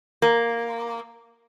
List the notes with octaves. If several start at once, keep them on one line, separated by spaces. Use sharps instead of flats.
A#3